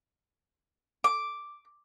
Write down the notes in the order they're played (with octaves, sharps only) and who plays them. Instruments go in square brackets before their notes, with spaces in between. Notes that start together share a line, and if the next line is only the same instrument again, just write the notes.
[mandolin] D6